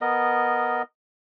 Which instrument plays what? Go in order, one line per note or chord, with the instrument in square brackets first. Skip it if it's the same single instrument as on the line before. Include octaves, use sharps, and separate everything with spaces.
[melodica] B3 A#4 D#5